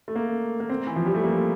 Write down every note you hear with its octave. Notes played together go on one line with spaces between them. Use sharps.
A3
A#3
A#3
C4
E3
F3
G3
A3
A#3